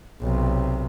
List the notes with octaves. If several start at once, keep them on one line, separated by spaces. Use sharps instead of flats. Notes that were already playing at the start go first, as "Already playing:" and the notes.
B1 C3